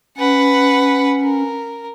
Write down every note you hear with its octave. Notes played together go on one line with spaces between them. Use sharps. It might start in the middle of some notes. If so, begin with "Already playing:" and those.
C#4 B4 F#5
A#4